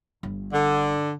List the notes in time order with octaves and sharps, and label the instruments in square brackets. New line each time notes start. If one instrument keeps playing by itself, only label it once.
[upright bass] G1
[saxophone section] D3